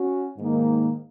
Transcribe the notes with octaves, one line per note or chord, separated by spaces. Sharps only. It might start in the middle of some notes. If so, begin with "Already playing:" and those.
Already playing: C#4 F#4
G#2 D#3 A#3 D#4